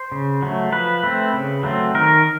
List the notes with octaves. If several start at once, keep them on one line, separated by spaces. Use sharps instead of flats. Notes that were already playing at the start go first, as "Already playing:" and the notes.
Already playing: C5
C#3
F#3 A3
F3 B4
A3 C4
C#3
F#3 A3 C4
D#3 A#4